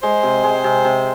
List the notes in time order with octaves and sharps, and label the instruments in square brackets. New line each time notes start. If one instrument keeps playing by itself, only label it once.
[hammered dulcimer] G#3 [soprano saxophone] C5
[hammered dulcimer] C3
G#3
C3
C3